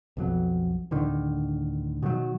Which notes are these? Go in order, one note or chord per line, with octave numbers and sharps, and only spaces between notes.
B1 F2 F#3
D1 D3 D#3
B2 D#3 E3 F#3